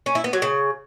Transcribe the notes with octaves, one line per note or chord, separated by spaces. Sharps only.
C#4
E4
B3
F#3
C#3